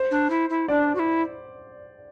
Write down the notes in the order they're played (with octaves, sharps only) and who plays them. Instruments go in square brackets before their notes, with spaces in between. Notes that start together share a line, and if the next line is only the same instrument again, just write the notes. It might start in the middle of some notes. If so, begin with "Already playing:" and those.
Already playing: [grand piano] C5
[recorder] D4
E4
E4
[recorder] D4 [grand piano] D5
[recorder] F#4
E4